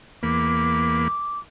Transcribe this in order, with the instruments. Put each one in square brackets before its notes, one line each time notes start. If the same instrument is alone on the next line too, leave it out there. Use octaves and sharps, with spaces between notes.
[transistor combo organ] E2 A#3 B5 [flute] D6